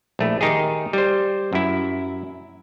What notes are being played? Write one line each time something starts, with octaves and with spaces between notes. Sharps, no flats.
A#1 A3 E4
D#3 D#4 G4 G#4
G3 C5
F#2 E4